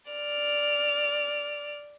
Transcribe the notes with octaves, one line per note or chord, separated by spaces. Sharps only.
D5 F6